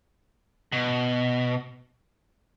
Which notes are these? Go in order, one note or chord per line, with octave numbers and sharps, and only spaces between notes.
B2